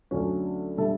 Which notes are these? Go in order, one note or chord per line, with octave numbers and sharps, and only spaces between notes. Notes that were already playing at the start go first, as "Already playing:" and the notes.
D2 D3 F#3 C#4
D3 G3 D4 A4 E5